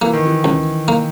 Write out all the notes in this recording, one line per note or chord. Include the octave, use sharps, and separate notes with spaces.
E3 A#3
D#3
E3
C#2
A#3